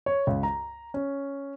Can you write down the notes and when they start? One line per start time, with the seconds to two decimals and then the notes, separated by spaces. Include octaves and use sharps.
0.06 C#5
0.27 C#2
0.43 A#5
0.94 C#4